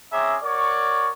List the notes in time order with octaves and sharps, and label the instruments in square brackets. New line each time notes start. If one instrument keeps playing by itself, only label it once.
[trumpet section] C4 C#4 G#4 E5 A#5 D6
F#4 A#4 C#5 D5 C#6